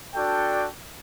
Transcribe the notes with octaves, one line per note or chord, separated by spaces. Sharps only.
D4 F#4 A4 D5 G5